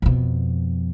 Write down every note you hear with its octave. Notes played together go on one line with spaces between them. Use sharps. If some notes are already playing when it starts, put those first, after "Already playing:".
F2 B2